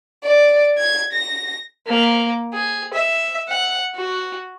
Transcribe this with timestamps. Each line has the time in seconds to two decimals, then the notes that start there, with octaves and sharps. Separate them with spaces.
0.24 D5
0.78 G#6
1.13 A#6
1.87 A#3
2.53 G#4
2.93 E5
3.48 F#5
3.95 F#4